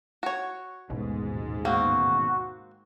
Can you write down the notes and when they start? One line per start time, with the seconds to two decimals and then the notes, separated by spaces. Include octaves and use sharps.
0.23 F#4 C#5
0.90 A1 D#2 G#2 B2 G#3
1.65 A#3 C4 F#4